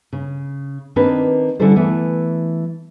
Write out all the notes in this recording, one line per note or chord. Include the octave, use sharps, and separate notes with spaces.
C#3
D#3 A#3 C4 D4 B4
D3 G3 C#4 E4 A4 C5
E3 A3 B3